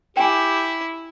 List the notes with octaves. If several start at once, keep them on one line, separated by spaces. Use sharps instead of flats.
E4 G4 G5 G#5